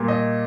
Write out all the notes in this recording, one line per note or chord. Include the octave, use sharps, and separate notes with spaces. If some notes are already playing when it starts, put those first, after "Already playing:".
Already playing: A#2 G3 A#3
D#5